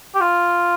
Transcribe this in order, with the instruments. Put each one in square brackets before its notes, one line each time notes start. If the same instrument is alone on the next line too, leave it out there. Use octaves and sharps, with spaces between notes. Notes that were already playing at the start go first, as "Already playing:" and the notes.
[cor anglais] G4
F4